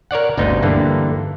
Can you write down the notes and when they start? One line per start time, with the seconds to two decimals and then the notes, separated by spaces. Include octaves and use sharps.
0.11 A#4 C#5 D5 F#5
0.37 G1 D2 C3 B3 D#4
0.63 G2 D3 E3 A#3